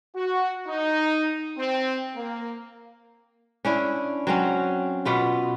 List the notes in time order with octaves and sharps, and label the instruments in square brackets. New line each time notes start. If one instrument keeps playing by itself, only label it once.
[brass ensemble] F#4
D#4
C4
A#3
[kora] C#4 D4 E4
F#3 C4 C#4
B2 B3 F4